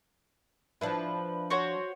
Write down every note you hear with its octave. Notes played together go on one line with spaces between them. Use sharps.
F3 D4 E4 B4
F#4 C5 C#5